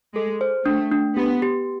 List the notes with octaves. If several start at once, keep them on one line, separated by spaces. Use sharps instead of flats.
G#3 A4
C5
A3 D4
D4
B3 G4
G4